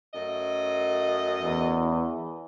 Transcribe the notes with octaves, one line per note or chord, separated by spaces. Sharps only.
F#2 A3 D#5
E2